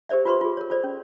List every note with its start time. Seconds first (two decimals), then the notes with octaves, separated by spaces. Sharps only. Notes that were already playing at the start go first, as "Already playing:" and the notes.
0.09 G4 A#4 C5 D5 E5
0.25 F4 F#4 B4 C5 C6 C#6
0.41 F4 G#4
0.57 A#4 C#5
0.70 F4 A4 C5 D5
0.84 C#4